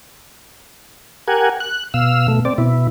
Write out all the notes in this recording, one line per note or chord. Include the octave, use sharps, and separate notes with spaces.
G4 A#4 F#5 G#5
F#6
B2 F5 E6
B2 A3
C4 D5
B2 E4